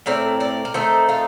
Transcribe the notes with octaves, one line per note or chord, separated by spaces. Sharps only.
A2 A3 C4 A#4 D5
A#4 D5
A#4
D#3 A3 C4 D#4 A4 C5
F4 A4